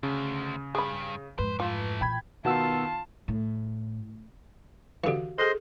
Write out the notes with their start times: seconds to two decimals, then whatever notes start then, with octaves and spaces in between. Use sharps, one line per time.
0.03 D2 C#3
0.75 G2 G#4 B5
1.39 F2 G#2 B4 C5
1.60 E3 A3 F4
2.01 A#2 E3 G5 B5 G#6
2.45 B2 D#3 B3 F4 F#4 A5 E6
3.28 A2
5.04 D3 E3 F#4 G4 F5
5.38 G#4 A4 C5 D#5 C6